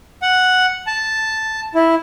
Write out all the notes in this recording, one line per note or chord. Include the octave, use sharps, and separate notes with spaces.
F#5
A5
E4